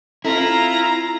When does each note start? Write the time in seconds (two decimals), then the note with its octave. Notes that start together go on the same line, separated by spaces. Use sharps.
0.25 C4 E4 F4 A4 A#5